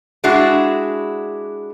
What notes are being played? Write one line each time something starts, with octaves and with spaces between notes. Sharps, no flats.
G#3 D4 E4 F#4 G#4